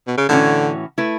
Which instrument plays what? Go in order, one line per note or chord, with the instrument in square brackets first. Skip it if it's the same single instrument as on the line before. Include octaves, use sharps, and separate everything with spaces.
[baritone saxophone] B2
C#3
[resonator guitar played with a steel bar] A2 E3 A3 C#4 F#4 [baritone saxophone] D3
[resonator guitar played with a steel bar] A3 E4 B4